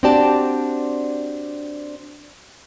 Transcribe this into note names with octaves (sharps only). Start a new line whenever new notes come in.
C4 D4 F#4 G4 D5 A5